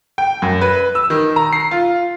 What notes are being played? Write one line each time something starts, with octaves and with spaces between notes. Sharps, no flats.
G5
F#2
B4
E6
D#3
A#5
C7
F4